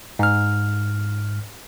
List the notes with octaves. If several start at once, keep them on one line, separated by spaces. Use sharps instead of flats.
G#2 F6